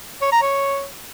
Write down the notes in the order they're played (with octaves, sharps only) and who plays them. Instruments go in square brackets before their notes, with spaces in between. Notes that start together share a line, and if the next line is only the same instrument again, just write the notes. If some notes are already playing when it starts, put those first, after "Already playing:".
[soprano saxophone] C#5
A#5
C#5